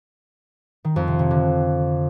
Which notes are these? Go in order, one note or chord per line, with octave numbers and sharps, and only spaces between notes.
D#3
F2
C3
C3
D3